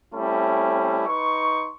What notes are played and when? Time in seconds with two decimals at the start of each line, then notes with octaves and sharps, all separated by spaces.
0.14 G3 A3 C4 C#4 E4
1.06 D#4 B4 C6 C#6